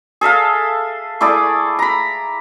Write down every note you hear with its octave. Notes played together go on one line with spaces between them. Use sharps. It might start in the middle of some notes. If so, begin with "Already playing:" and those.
G#4 A4 E5 F5
A3 E4 G#4 D5
A#5 B5